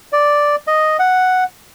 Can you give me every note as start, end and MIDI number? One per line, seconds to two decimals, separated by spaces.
0.13 0.56 74
0.67 0.97 75
0.99 1.44 78